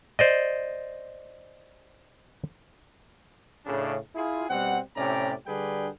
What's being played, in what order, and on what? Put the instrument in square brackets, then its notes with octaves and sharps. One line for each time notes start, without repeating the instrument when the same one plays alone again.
[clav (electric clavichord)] C5 D5 D#5
[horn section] A2 C#3 D4
E4 F4 G#4
B2 G3 C4 F#5
A2 C3 C#4 G4 D5 A#5
D3 G3 D4 G#4 B4 G5